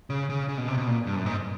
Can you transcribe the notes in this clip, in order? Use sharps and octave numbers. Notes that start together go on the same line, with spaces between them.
C#3
C#3
C#3
B2
C3
B2
A#2
G2
F#2
G#2